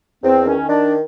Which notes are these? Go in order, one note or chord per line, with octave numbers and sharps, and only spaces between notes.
E2 C4
D#3 C#4
D#3 D4